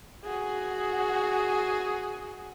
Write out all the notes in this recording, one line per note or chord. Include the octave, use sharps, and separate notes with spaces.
F#4 G#4